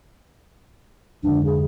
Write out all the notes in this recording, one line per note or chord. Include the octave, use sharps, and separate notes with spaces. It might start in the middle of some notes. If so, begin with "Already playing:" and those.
F2 G#2 D3 D4
G#4